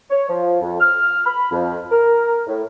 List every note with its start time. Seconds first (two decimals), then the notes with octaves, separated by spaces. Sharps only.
0.11 C#5
0.29 F3
0.62 F2
0.80 F6
1.26 B5
1.52 F2
1.91 A#4
2.47 A2